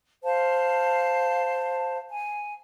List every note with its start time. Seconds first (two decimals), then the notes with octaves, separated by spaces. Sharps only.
0.24 C5 F5 A5
2.10 G#5